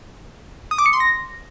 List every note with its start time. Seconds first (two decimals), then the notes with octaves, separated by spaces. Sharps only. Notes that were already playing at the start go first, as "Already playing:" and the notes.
0.71 D#6
0.78 D6
0.86 C#7
0.93 C6
1.00 A#6